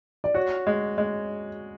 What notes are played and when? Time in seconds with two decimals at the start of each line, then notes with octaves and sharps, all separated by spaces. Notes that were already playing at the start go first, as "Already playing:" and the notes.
0.24 D5
0.34 F#4 C#5
0.67 G#3
0.98 G#3